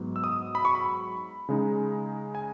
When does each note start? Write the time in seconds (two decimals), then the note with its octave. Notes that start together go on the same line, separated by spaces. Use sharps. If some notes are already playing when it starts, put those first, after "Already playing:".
Already playing: G#2 F#3 B3
0.16 E6
0.24 D#6
0.55 B5
0.65 C#6
0.75 B5
1.49 C#3 G#3 D#4
2.35 G#5